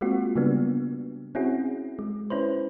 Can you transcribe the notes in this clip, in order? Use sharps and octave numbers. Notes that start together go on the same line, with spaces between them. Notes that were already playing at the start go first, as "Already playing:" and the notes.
G#3 A#3 C4 F4 F#4
C#3 G3 A#3 B3 D4
C4 C#4 E4 F#4 G#4
G#3
C#4 E4 B4 C5